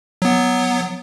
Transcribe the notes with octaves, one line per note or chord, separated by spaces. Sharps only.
F#3 B3